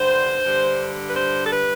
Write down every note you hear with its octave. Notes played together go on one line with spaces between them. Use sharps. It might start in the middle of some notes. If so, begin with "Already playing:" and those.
Already playing: G2 D3 G3 C5
G2 D3 G3
B4
C5
A4
B4